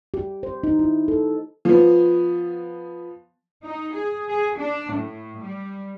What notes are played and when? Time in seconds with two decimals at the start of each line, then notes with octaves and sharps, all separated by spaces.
0.14 G4
0.43 C5
0.64 D#4
0.79 E4
1.08 A4
1.65 F3 B3
3.64 D#4
3.96 G#4
4.29 G#4
4.58 D4
4.94 A2
5.43 G3